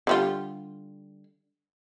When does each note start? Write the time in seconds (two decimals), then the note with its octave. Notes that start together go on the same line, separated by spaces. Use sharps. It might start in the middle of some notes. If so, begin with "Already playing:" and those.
0.07 D3 G3 F4